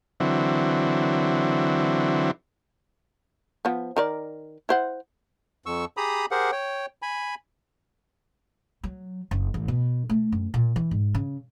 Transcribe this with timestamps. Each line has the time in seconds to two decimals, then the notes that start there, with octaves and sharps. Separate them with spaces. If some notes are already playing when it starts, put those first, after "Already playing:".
0.20 D3 E3 F#3 C4
3.65 F3 B3
3.97 D#3 A#4 D5
4.69 E4 C5 F#5
5.66 F2 C#6 E6
5.97 G4 G#4 A#5 B5 D#6
6.31 G4 G#4 A#4 C5 F#5
6.52 C#5 G5
7.02 G#5 B5
8.84 F#3
9.31 F#1
9.54 A1
9.68 B2
10.09 A3
10.32 F#2
10.54 A#2
10.76 E3
10.91 G#2
11.15 C#3